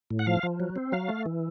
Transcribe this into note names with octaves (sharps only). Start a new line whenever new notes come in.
A2
F#5
F3 F5
F3
F#3
C4
F#3 F5
A3
E3